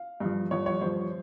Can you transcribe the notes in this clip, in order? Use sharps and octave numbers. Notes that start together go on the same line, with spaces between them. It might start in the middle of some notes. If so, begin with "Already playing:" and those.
Already playing: F5
G2 F3
G2 F3 C#5
C#5
G2 F3 C5